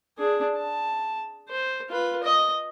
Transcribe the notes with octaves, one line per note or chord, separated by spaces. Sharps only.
D4 G#4
A5
C5
F4 B4
D#5